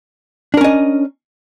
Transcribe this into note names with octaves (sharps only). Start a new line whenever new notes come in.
C#4 D4 A#4 D#5